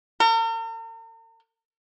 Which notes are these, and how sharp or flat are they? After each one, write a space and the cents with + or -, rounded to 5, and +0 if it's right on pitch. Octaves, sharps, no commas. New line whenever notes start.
A#4 -45